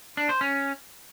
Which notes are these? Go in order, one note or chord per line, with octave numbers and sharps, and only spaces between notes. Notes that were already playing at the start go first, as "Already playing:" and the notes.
D4
C5
C#4